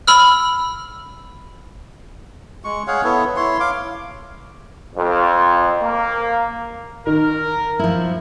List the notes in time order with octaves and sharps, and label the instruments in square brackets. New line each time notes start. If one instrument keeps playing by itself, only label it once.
[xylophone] B5 E6 F6
[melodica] G#3 C#6
G#4 C#5 F5 F#5
B3 E4 A4 C#5
E4 C#5 C6
F5 D6
[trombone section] F2
A#3
[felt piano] D#3 [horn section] A#4
[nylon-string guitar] F3 E4